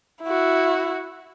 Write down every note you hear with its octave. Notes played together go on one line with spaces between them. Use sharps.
E4 F#4